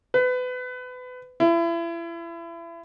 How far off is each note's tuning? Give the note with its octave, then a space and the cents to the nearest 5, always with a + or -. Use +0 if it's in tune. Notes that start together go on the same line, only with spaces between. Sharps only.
B4 +30
E4 +35